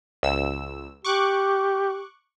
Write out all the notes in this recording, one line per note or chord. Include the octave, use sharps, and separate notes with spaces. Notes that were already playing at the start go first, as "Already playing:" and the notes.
C#2 E6
G4 C#6 D6 F#6